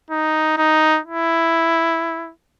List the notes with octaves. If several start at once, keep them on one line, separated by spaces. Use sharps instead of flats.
D#4
D#4
E4